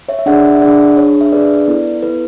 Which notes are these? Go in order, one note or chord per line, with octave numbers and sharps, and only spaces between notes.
C#5 E5
E5
D4 G#4 D5 F#5
E5
D4 G#4 D5 F#5
D4 G#4 C#5
E5
D4 G#4 B4 D5
B3 E4 A4
B3 E4 A4 B4